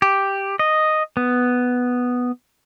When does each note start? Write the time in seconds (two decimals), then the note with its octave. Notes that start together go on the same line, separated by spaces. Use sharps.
0.02 G4
0.59 D#5
1.17 B3